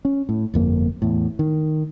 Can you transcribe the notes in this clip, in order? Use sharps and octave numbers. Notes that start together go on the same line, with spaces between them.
C#4
A2
G1 F2 A#3
E2 A2
D#3